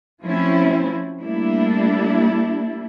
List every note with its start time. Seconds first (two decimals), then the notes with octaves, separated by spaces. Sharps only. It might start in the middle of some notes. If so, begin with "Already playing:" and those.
0.23 F3 F#3 A3 C4 C#4 E4
1.22 G3 A3 A#3 D4 E4